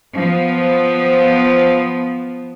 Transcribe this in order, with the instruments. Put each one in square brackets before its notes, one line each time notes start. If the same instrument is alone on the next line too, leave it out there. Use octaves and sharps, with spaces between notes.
[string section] F3 B3